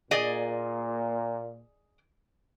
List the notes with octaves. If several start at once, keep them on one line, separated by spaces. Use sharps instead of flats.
A#2 G#4 D5 D#5